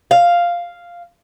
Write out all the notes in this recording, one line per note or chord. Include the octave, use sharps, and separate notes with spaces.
F5